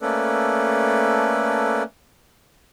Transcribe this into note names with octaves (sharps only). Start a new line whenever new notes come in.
A3 A#3 C#4 A4 B4 D5